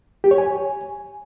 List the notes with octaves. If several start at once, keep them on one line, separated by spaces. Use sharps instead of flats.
G4
C#5
G#5